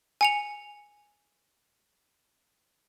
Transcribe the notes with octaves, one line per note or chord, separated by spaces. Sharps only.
G#5 C#7 F7